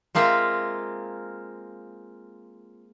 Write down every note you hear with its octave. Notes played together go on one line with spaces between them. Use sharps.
G#3 A#3 C4 F4 E5 F5